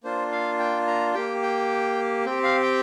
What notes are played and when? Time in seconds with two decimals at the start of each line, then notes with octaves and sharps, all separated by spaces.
0.04 A#3 D4 F4 C5
0.32 F5
0.59 G5
0.87 A#5
1.14 A#3 G4 G5
1.42 G5
2.25 C4 G4 G5
2.44 F5
2.62 G5